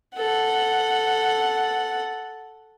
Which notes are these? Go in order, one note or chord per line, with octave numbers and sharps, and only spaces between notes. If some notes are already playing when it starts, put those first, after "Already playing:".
A4 F#5